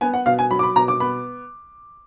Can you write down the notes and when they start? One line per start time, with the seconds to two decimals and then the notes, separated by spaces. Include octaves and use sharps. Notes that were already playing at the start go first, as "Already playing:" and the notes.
0.01 B3 G#5
0.14 F#5
0.26 B2 F5
0.39 G#5
0.51 F#3 B5
0.59 D6
0.63 B5
0.76 B2 A#5
0.88 D6
1.00 B3 B5